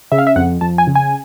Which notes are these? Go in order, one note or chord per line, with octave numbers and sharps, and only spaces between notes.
C#3 E5
F5
E5
F2 F#5
F2 A5
G#5
C#3
G#5